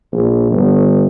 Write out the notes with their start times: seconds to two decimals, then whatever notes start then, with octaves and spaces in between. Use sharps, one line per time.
0.12 A#1
0.51 G1